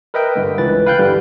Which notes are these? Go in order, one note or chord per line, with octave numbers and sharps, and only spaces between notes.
A#4 B4 D#5 E5 G5
G2 D3 A3
C#2 E3 B4 A6
B4 F5 G5 F#6 G6
G2 D3 E3 G3